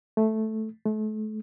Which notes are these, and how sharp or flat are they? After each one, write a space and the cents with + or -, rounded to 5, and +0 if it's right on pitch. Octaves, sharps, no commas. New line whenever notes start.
A3 -5
A3 -35